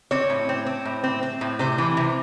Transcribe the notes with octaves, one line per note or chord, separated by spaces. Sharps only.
C4 C#5
A2
C4
C4
A2
C4
C4
A2
C3 C5
E3
C3